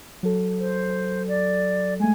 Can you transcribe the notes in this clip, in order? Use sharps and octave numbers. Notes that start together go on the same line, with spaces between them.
F#3 A4
C5
D5
G#3 A3 G#5